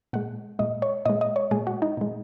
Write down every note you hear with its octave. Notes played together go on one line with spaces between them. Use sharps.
A#2 G#3 F#5
A#2 G#3 D#5
C#5
A#2 G#3 D#5
D#5
C#5
A#2 G#3 G#4
F#4
D#4
A#2 G#3